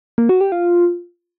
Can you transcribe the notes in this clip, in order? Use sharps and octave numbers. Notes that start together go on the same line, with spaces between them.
A#3
F#4
G4
F4